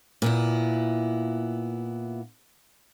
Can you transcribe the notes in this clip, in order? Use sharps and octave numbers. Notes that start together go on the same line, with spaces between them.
A#2 B3 E4